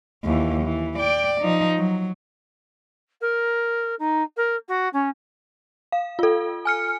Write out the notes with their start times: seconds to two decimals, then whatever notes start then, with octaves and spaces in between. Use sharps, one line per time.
0.24 D#2 E3
0.63 E3
0.99 D5 G5
1.41 F3 D#4
1.77 F#3
3.21 A#4
3.99 D#4
4.37 A#4
4.68 F#4
4.93 C#4
5.92 F5
6.19 F4 A4
6.65 G#5 F6 C#7